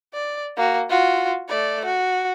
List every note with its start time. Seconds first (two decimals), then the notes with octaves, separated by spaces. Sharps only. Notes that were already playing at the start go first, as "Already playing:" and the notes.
0.14 D5
0.57 A#3 F#4
0.89 F4 F#4
1.49 A3 D5
1.85 F#4